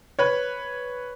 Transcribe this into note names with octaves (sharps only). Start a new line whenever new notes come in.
B4 C#5